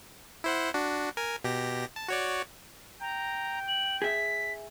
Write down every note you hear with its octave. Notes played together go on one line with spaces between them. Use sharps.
E4 C5 F#5
D4 F#4
A#4 G#5
B2 G4 A#6
A5
F#4 C#5 D5
G5 A#5
F#7
G#4 E5 B6